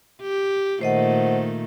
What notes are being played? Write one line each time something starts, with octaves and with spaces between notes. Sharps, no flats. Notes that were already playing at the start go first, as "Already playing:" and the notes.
G4
A#2 D#3 A3 C5 D#5 F#5